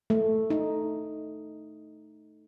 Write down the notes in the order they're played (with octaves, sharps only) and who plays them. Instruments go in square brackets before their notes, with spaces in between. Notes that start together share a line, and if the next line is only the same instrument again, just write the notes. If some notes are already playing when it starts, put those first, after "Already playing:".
[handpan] A3
D#4